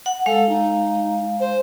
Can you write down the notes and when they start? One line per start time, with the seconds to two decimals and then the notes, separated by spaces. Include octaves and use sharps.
0.06 F#5
0.26 G#3 A4 F5
0.49 D#4
1.39 C5